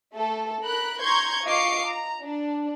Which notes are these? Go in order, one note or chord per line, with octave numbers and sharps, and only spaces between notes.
A3 A4
A#4 B5 F#6
A#5 C6 C#6 G6 G#6
F4 D#5 F5 C#6 D6 C7
A#5
D4